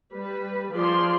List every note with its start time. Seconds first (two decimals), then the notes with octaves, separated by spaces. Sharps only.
0.12 G3 B4
0.72 F3 F4 G#4 D5 C6